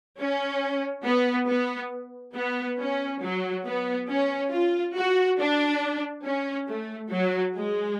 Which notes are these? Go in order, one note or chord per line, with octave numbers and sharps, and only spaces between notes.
C#4
B3
B3
B3
C#4
F#3
B3
C#4
F4
F#4
D4
C#4
A3
F#3
G#3